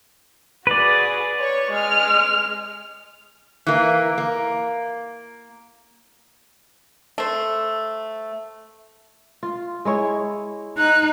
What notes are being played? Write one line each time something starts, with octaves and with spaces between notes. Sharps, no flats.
F#4 G#4 B4 D5
C#5 C#6
G#3 F6
E3 A#3
A#3
A3 C5
F4
G#3 E4 C#5
D#4 F#6